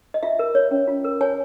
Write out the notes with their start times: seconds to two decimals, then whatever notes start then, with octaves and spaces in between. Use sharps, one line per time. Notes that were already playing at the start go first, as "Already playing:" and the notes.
0.14 D#5
0.23 F4 E5
0.39 A#4
0.55 C#5
0.71 C#4
0.87 F4
1.04 A#4
1.21 C#5 G#5